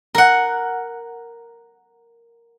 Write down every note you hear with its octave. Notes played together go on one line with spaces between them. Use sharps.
A#4 F#5